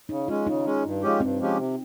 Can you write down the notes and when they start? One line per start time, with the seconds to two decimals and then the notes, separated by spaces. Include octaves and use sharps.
0.09 C#3 D#4
0.28 G#3 C#4 F4
0.47 C#3 D#4
0.65 G#3 C#4
0.84 G2
1.02 F3 G#3 C#4 G4
1.20 G2 C4
1.39 F3 G#3 C#4 G4
1.57 C3